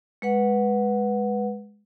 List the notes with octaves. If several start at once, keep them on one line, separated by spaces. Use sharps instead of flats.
G#3 B4 F#5